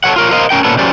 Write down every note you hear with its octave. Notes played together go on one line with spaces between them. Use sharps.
A4 A#4 C#5 F#5
F4 A#4 C#5
A#4 C5 D#5 F5
C#4 A#4 G5
A#2 B3 C#4 A4 B4
F#3 C#4 G4 A#4 C5 D5